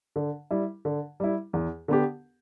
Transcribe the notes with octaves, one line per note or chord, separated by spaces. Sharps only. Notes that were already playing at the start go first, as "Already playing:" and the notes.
D3
G3 E4
D3
G3 E4
E2
D3 B3 G4